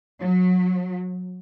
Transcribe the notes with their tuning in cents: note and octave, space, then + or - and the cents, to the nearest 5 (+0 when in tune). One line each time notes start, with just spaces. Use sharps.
F#3 -25